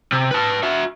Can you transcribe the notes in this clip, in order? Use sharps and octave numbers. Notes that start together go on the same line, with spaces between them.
C3
B4 A5
F#4 E5